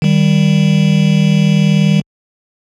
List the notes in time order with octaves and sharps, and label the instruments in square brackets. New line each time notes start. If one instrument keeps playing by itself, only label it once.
[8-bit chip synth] D#3 G3